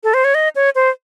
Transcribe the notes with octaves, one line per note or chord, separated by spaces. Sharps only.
A4
C5
C#5
D#5
C#5
C5